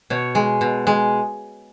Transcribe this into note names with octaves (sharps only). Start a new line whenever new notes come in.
B2 C#5
G#3
B2
G#3